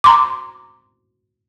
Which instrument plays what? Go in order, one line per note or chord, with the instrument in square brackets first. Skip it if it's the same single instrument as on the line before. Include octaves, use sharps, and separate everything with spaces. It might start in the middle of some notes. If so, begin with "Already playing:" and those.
[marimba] A#5 C6 D6